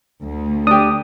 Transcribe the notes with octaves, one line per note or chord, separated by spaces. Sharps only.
D2
D4 G4 D#6